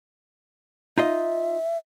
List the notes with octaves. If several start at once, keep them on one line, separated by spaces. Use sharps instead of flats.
D#4 F4 D#5 E5